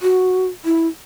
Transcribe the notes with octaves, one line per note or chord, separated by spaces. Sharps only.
F#4
E4